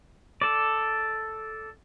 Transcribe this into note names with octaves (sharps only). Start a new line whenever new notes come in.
A4 D5